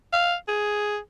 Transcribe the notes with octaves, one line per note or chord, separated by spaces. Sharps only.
F5
G#4